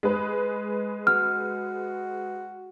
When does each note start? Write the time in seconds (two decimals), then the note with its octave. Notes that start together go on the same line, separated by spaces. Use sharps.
0.03 G#3 B4
1.07 F#4 F6